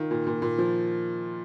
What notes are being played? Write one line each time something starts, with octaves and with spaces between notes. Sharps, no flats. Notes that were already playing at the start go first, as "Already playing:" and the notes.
Already playing: D#3 F4
A#2
A#2
A#2
F3